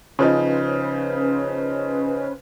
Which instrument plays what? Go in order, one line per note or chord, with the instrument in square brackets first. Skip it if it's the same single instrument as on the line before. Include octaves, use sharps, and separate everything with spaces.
[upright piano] C#3 F3 D#4 [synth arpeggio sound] C#4 B4 C5